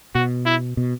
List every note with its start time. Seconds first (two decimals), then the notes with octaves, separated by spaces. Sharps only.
0.15 B2 F#4
0.46 E4
0.77 B2